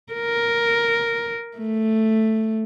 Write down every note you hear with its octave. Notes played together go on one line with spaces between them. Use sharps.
A#4
A3